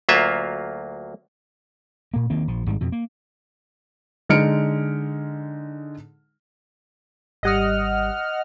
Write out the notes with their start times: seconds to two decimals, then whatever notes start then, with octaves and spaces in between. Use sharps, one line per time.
0.09 D2 F#3 A#3 F4 E5
2.14 A#2 A#3
2.30 D#3 A#3 C4
2.47 A#1 F3
2.66 G#1 G#2 G3
2.81 F2 B2
2.92 A#3
4.29 D3 G#3 D#4 F6 C#7 D7
7.43 G#1 G3 D#5 F#5 D#6 F6